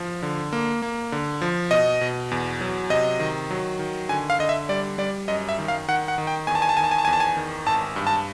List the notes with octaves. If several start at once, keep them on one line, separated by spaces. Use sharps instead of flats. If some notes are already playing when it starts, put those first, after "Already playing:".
Already playing: F3
D3
A#3
A#3
D3
F3
B2 D#5
B2
E2
F#3
C3 D#5
D#3
F#3
D#3
D3 G#5
F5
D3 D#5
E5
G3 D5
G3 D5
F#2 D#5
E5
D#3
F5
D#3 F#5
F#5
D#3
G5
E2 G#5
A5
G#5
A5
D#3 G#5
A5
G#5
A5
G#5
E2
A5
G#5
D#3
G#1 A5
G2
A5